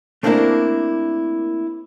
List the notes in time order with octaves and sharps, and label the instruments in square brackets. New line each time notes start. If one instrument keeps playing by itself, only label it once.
[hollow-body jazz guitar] A3 A#3 C4 D4 E4 A#4